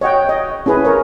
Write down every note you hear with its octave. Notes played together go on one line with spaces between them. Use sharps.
C#5 D#5 F#5 G5
D#5
C#4 E4 G#4 B4
A#4 C#5